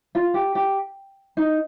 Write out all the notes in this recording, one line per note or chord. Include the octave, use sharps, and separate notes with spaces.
F4
G4
G4
D#4